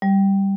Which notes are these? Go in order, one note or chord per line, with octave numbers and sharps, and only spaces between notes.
G3